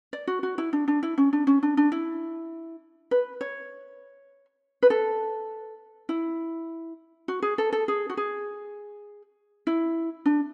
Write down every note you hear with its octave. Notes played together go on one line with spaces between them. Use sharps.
D5
F#4
F#4
E4
D4
D4
E4
C#4
D4
C#4
D4
D4
E4
B4
C#5
B4
A4
E4
F#4
G#4
A4
A4
G#4
F#4
G#4
E4
D4